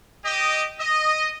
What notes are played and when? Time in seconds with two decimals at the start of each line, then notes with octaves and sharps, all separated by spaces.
0.24 G4 D#5
0.79 D#5